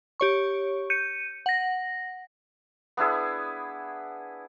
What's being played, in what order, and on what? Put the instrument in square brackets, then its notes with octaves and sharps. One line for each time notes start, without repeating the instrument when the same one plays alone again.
[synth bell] G4 C#5 C#6
G6 C#7 D#7
F#5 A#6
[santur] B3 D4 E4 G#4